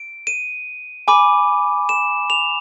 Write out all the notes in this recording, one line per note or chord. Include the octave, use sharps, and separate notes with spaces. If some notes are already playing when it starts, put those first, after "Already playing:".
Already playing: D7
D#7
G#5 B5 D6
E7
F7